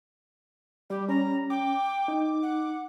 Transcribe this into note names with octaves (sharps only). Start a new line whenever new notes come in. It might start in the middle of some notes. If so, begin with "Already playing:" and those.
G3 G4
C#4 A#5
G5 D6
D#4
F#5